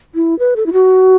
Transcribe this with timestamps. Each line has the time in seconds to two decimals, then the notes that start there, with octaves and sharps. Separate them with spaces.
0.15 E4
0.39 B4
0.56 A4
0.66 E4
0.73 F#4